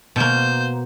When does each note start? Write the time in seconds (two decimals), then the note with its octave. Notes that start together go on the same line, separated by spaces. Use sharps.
0.16 B2 A#3 C5 G6